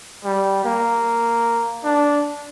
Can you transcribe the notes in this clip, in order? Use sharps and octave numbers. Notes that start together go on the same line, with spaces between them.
G3
A#3
D4